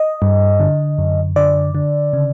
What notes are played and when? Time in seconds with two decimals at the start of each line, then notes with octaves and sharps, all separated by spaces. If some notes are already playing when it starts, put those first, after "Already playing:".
Already playing: D#5
0.22 G2
0.60 D3
0.98 F#2
1.36 D3 D5
1.75 D3
2.13 C#3